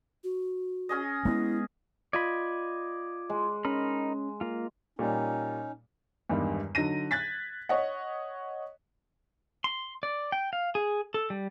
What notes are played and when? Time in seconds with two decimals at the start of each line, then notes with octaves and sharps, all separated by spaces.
0.24 F#4
0.89 C#4 G#4 D#5
1.25 G#3 B3 E4
2.13 F4 D5 D#5 B5 G#6
3.30 G#3
3.65 C#4 D#4 A#4 B5
4.41 A#3 F4
4.99 A#2 G3 A#3 C#4 D#4
6.29 E2 G2 D#3 G3 G#3
6.75 D3 F#3 D#4 A#6 D#7
7.11 F#6 G#6 A6 B6
7.69 C#5 D#5 F#5
9.64 C6
10.03 D5
10.32 G5
10.53 F5
10.75 G#4
11.14 A4
11.30 G3